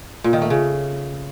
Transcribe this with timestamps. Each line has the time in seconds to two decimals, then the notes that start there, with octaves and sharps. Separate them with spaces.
0.24 A#2
0.33 D#3
0.42 A3
0.50 C#3